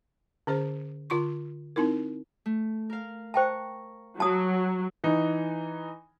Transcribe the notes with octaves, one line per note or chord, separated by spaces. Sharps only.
D3 C#4 G#4 C5
D3 F4 C6 C#6
C4 D#4 E4 A#4
A3
A#4 F5
C5 G5 A5 A#5 C#6
F#3 A5 D#6
E3 D#4